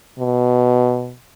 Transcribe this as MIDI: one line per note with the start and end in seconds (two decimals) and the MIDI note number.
0.19 1.15 47